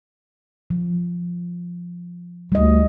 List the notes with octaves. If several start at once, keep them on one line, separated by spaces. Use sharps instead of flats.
F3
D2 G3 D#5